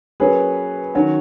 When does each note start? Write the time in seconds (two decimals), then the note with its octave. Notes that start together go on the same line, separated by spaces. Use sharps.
0.20 F#3 A#3 C#4 G#4 B4
0.95 D#3 F#3 C#4 F#4